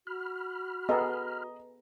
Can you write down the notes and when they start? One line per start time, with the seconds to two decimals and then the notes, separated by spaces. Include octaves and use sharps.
0.07 F#4 B5 F6
0.89 B3 G#4 A4 D#5 A#5